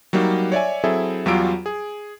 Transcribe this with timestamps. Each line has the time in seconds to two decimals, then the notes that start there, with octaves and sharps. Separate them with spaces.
0.13 F#3 G3 A#3 D#4
0.52 C#5 D5 E5 G#5
0.84 F#3 C4 E4 G#4 A4 E5
1.26 E2 F#3 G3 F4 E6 D7
1.66 G#4